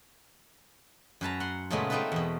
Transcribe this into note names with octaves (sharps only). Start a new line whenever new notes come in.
F#2 B4 A5 A#5
F#5 C6
A#2 C#3 G#3 A3 B3
A3 A#3 C4 D#4 F4 B4
E2 B2